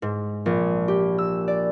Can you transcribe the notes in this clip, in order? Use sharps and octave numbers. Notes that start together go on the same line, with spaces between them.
G#2
A#1
G4
E6
D5